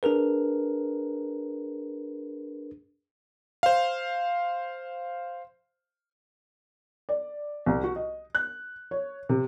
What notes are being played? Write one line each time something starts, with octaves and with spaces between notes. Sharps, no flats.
D4 G#4 A#4 B4
C5 F5
D5
C2
F#4
D#5
F#6
C#5
C3